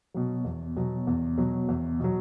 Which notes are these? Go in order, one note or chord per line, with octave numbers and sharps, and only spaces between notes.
B2 F#3
E2
B2 F#3
E2
B2 F#3
E2
B2 F#3